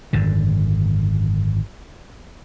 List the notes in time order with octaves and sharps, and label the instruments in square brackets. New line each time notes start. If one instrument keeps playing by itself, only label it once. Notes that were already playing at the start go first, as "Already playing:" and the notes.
[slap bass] G#1 F#2 D3